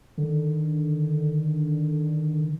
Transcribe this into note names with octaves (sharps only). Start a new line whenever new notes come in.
D3 D#3